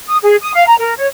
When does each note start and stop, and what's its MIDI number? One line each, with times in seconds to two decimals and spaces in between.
0.08 0.18 87
0.23 0.36 68
0.41 0.54 87
0.54 0.64 77
0.67 0.75 82
0.79 0.94 70
0.98 1.06 73